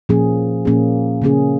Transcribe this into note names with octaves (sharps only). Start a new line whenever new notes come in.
A#2 F3 A#3 C#4 G#4
A#2 F3 A#3 C#4 G#4
C#3 A#3 C#4 G#4